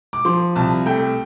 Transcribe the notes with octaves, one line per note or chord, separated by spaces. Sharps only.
D6
F3 C6
C2 A5
A3 G5